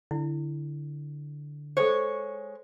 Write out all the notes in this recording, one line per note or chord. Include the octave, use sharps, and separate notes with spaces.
D3 E4
G#3 A4 C5 C#5